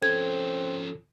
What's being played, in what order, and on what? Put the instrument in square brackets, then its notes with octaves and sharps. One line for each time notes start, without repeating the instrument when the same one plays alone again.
[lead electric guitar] F3 C#4 [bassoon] C4 [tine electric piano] A4 [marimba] G#6